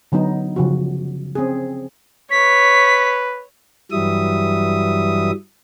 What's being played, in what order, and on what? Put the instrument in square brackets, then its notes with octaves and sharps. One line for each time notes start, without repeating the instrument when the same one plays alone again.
[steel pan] D3 F#3 B3 D#4
C#3 F3 F#4
C4 C#4 G#4
[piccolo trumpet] B4 [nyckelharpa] C#5 [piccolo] B6
[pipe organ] G2 E3 F#3 G3 E5 D#6